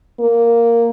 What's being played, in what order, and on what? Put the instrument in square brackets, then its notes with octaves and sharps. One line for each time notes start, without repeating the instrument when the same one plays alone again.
[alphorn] A#3